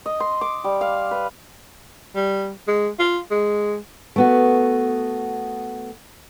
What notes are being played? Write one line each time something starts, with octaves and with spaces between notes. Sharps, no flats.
D#5
C6
D6
G3
F5
B4
G3
G#3
F4
G#3
A3 B3 F#4